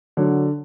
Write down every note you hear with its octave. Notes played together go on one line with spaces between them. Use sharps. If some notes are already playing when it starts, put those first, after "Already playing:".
D3 F#3